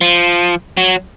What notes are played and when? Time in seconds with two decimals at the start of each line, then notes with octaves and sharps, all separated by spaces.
0.01 F3
0.77 F#3